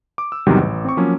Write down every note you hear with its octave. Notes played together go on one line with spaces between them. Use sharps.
D6
E6
E2 G#2 C3 D#3 F#3 G3
A1
C4 C#6
F3 F#3 A#3 C#4